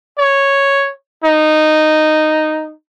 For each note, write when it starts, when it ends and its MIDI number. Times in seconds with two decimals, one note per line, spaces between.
0.19 0.92 73
1.24 2.73 63